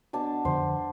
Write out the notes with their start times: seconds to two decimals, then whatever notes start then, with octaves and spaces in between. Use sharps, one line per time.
0.13 B2 D4 A5
0.45 F2 D3 C5